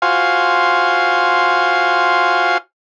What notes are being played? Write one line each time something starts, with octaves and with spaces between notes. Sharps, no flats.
F4 F#4 C5 F5 G#5